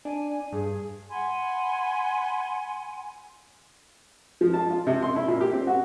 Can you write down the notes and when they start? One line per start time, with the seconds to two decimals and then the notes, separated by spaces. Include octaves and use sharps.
0.05 D4 G#5
0.52 G2 G#4
1.09 F#5 G#5 B5 C6
4.41 F3
4.54 A5
4.70 F4
4.87 C3
5.02 C6
5.16 E4
5.28 A#2
5.41 G4
5.54 C4
5.67 F#4